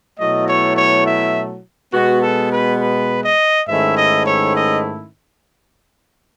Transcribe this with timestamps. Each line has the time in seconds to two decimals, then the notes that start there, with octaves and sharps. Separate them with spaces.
0.19 B2 F#3 A3 E4 D#5
0.48 C#5
0.77 C#5
1.06 E5
1.93 B2 G#3 B3 F#4
2.22 A4
2.51 B4
2.80 B4
3.24 D#5
3.68 G#2 D#3 A3 C#4 E4 E5
3.97 D#5
4.26 C#5
4.55 D#5